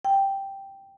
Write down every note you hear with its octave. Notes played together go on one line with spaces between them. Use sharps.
G5